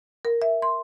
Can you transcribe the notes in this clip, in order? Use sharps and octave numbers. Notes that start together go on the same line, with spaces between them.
A#4
E5
C6